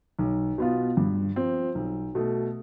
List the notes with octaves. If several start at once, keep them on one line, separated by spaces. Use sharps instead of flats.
B1
B2 B3 F4
G2
F3 C4
B1
B2 A3